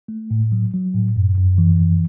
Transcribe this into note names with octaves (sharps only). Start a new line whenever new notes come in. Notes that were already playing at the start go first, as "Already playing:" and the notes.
A3
A2
F#3
F#3
A2
F#2
F#2
E3
F#2